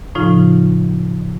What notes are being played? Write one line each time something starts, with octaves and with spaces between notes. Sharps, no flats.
A2 C#3 F3 D#4 F4